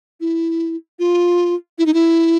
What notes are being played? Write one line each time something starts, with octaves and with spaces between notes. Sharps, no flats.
E4
F4
E4
D#4
E4